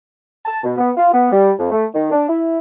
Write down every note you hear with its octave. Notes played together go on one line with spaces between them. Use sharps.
A5
B2
B3
F4
B3
G3
F2
A3
D#3
D4
E4